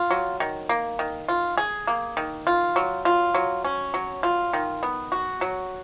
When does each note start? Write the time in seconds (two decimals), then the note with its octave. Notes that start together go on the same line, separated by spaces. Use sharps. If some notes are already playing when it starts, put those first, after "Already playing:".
Already playing: F4
0.11 F#3
0.40 D#3
0.69 A#3
0.99 D#3
1.29 F4
1.58 G#4
1.87 A#3
2.17 D#3
2.47 F4
2.76 F#3
3.05 F4
3.35 F#3
3.65 C#4
3.94 F#3
4.23 F4
4.53 D#3
4.83 B3
5.12 F#4
5.41 F#3